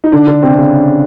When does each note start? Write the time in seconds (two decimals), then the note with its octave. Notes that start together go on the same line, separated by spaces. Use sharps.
0.04 D#4
0.12 D3 D4
0.27 D3 D4
0.42 C3 C4
0.54 C4
0.58 C#3 C#4